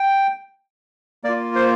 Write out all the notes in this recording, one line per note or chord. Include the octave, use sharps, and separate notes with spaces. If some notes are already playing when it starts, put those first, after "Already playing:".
Already playing: G5
A#3 F4 D5
C5